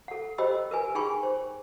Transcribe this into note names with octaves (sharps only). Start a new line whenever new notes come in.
A4 F#5
G4 C5 D#5 G5 B5 E6
A#4 B4 G#5
D#4 G#4 G5 G#5 B5 C#6
C5